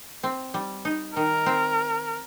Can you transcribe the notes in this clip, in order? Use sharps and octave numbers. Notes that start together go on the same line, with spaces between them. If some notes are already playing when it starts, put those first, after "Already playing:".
C4
G3
D#4
D#3 A#4
C4